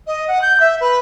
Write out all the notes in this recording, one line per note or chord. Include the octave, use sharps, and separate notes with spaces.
D#5
F#5
G6
E5
B4